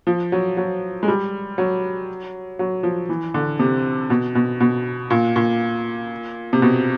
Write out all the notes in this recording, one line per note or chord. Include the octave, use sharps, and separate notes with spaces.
F3
F#3
F#3
G#3
G3
F#3
F#3
F3
E3
D3
C3
B2
B2
B2
A#2
A#2
C3
B2